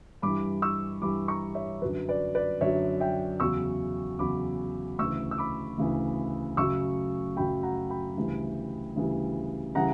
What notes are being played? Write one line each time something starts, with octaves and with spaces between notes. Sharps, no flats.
G2 E3 G3 B5 D6
C#6 E6
G2 E3 G3 B5 D6
A#5 C#6
C#5 E5
F#2 D3 F#3 B4
B4 D5
B4 D5
F#2 D3 F#3 C#5 E5
E5 G5
E2 C#3 F#3 C#6 E6
E2 C#3 F#3 B5 D6
D2 C#3 E3 C#6 E6
E6
B5 D6
D2 C#3 E3
F#2 C#3 F#3 C#6 E6
F#2 C#3 F#3 G5 B5
F#5 A#5
G5 B5
D2 C#3 E3 G3
D2 C#3 E3 G3
C#3 E3 G3 F#5 A#5